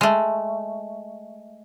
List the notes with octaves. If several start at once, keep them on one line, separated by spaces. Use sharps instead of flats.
G#3 A3